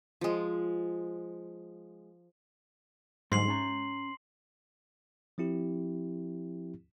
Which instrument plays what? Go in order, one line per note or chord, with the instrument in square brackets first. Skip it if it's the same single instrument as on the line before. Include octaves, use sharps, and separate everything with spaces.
[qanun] F3 G#3
[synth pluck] G#2 [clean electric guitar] D3 F#3 G3 [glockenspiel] C6 C7 F#7
[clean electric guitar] C#4 C#5 A#5
[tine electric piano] F3 C4 E4 G4